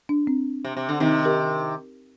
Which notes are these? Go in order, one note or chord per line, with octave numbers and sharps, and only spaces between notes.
D4
C4
C3
C3
D3
C3 D#3 C4 D#4
G4 A#4